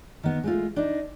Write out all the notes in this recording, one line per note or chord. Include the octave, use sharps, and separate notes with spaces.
D#3 B3
G#3 A3 F4
D4 D#4